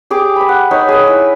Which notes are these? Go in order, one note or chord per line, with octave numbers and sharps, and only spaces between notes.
G4 G#4 D6
B5 D6
F#5
D#4 B4 C#5
G#4 B4
E4